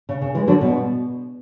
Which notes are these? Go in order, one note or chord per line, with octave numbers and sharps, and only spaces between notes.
C#3
C#3
E3 G#3
D3 F#3
B2